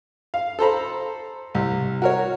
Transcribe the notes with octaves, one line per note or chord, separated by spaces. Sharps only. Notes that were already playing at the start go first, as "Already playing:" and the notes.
F5
A4 C5 A#5 B5
C2
F#4 A#4 C#5